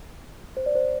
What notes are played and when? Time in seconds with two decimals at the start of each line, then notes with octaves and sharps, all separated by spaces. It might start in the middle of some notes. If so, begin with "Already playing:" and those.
0.57 C5
0.66 D5
0.75 C5